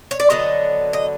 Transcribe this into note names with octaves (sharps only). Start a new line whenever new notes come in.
C#5
D5
D3 F#3 B3 D#5
D#5